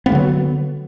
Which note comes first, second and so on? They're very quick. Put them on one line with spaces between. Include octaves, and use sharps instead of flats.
B3 A#3 D3 F#3